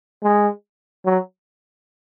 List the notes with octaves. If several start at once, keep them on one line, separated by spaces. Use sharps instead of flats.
G#3
F#3